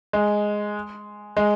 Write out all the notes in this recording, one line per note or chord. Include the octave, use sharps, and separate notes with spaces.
G#3
G#3